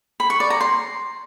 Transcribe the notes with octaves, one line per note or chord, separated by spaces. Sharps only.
B5
C#6
D5
A#5
C6